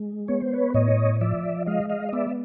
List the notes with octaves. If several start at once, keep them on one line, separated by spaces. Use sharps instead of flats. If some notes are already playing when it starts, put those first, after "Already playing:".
Already playing: G#3
B3 C#5
C5
B4 C#5
A2 C#5 D#5
F3 D5 E5
G#3 D#5 F5
D#5 F5
D#5
B3 D5 E5